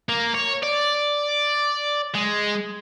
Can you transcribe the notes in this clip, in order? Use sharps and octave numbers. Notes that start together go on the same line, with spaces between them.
A#3
C#5
D5
G#3